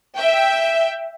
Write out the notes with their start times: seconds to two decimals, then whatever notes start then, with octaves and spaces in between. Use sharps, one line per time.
0.18 E5 G5